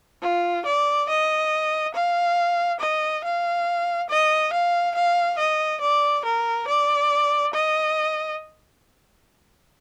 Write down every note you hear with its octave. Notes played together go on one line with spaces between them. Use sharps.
F4
D5
D#5
F5
D#5
F5
D#5
F5
F5
D#5
D5
A#4
D5
D#5